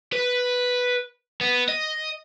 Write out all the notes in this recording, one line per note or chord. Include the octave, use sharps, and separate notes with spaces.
B4
B3
D#5